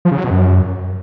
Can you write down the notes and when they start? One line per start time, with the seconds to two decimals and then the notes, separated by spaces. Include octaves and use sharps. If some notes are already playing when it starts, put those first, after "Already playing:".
0.05 F3
0.11 C#3
0.18 F#3
0.24 B2
0.31 F#2